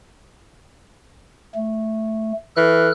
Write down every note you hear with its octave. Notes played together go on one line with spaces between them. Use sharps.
A3
E3 A4 F6 F#6